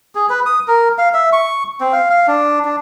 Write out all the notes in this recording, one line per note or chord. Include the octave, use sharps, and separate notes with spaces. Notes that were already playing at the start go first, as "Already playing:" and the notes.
G#4
B4
D#6
A#4
F5
E5
C#6
C4
F5
F5
D4
D4